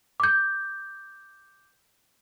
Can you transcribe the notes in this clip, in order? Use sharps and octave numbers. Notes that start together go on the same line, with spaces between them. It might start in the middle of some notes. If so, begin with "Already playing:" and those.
D6 G6